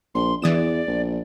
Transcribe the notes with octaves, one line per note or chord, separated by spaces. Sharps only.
A#1 C6
E2 E3 D5 D#6 E7
A#1